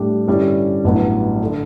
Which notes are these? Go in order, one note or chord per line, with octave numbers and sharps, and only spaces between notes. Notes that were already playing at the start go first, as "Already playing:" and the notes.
Already playing: A2 G3 D4 G4
G2 D3 G3 C#4 E4
A1 G2 F#3 B3 E4
D3